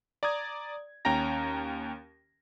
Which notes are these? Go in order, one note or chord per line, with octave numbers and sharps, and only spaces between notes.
D5 A#5 D#6 G#6
D#2 C#4 G5 A#5 A#6